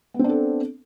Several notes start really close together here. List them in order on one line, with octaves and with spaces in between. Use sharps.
B3 C4 D4 A4